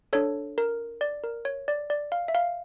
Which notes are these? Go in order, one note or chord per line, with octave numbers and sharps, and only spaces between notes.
D4 A4 C#5
A#4
D5
A#4
C#5
D5
D5
F5
E5
F5